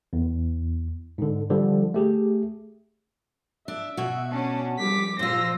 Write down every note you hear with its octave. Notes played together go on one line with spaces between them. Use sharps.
E2
G#2 D3
D3 F3 G3
A3 G4 G#4
D4 E5
B2 F#4
C#4 D4 A5
F3 G3 D6 B6
A#2 F3 F4 C5 E6 A#6